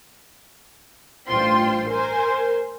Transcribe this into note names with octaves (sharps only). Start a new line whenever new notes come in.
A1 G2 F4 C5 G5 C6
A#4 C5 G#5